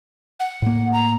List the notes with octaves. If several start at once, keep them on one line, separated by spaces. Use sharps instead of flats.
F#5
A2 A#3
A#5